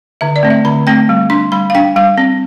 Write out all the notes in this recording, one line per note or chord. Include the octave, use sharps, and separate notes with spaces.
D3 E5
D5
A3 C4
E5
D3 B5
A3 C4 G5
G3
D4 C6
G3 B5
F5
D4 G5
G3 F5
C4